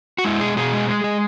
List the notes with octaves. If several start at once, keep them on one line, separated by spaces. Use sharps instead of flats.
F#4
G#3 E4
B2 G#4
B2 G#4
G#3
G#3
G#3